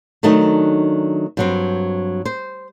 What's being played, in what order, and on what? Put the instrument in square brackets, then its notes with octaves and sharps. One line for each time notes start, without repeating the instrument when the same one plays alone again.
[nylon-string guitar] D#3 F#3 A3 D4 D#4
G2 F#3 C4
C5